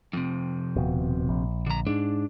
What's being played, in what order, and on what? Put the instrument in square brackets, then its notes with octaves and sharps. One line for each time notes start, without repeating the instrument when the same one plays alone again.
[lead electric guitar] F2 C3
[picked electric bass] D#1 B2
A#1
[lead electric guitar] D3 A#5
[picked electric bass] G#2 [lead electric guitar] D4